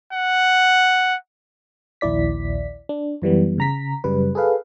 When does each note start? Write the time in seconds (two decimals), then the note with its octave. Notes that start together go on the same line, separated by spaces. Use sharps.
0.13 F#5
2.01 A#1 D#2 E4 D5 B6
2.89 D4
3.22 F#2 E3 G3 B3
3.58 C#3 A#5 B6
4.04 F#2 C#3 G3 B4
4.35 G#4 A4 B4 F5